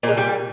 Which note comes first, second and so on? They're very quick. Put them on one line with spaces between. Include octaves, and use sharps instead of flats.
A#2 G#3 D3 G3